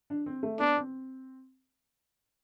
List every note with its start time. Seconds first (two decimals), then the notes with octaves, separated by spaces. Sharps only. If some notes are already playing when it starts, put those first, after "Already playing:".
0.10 D4
0.26 C4
0.43 A3
0.59 B3 D4
0.77 C4